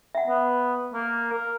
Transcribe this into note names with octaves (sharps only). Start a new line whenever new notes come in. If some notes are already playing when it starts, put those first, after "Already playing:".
E5 F#5
B3
A#3
A#4